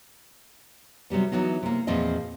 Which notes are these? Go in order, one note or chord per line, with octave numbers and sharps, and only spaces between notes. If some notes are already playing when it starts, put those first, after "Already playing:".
C3 F#3 G3 B3
E3 F#3 B3 D#4
C3 A#3
E2 A#2 F3 C4 F4 D#5